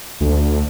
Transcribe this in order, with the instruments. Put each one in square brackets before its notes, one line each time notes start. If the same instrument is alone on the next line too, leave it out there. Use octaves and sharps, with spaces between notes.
[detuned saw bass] D2